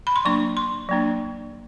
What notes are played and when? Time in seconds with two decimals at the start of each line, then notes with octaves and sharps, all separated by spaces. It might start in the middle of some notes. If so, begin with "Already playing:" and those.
0.07 B5
0.16 C6
0.25 F#3 A#3 D4 C#6
0.57 C6
0.89 F#3 A#3 D4